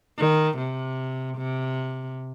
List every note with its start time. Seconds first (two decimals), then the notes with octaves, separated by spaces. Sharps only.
0.19 D#3
0.58 C3
1.38 C3